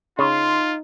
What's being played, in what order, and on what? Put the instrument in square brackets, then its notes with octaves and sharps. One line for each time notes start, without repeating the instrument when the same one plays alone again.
[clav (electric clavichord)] C#3 [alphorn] D#4 [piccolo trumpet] F4 [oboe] C6